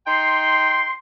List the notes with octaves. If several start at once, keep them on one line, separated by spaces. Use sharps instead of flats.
D#4 G5 C6